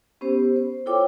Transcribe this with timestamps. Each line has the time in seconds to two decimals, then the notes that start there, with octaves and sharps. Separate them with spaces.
0.21 B3 C#4 G4 C5
0.56 C5
0.86 E4 F4 A4 C#5 G5 D6